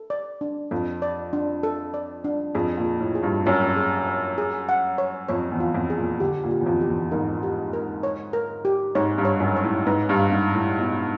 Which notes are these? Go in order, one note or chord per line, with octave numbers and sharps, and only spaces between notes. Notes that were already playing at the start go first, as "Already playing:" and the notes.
Already playing: A4
D5
D4
F2 A4
D5
D4
A4
D5
D4
F2 G#4
A#2
G#4
A2
G#4
G2
F#2 C#5
G#4
C#5
G#4
F#5
C#5
F2 C#5
E2
F4
F2
G#4
A#2
D3 G4
A#2
G4
E2
F2
G4
E2
G#2 A#4
G4
A#4
C#5
A#4
G4
G#2 C#5
G2
C#5
F#2
C#5
A2
G#2 B4
G2
F5
G#2
A#5
A2
B2 A#5